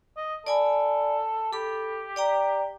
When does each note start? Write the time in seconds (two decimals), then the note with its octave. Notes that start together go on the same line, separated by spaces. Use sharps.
0.17 D#5
0.47 A4 D5 G#5 B5
1.53 G4 A4 B5
2.16 D5 G5 A#5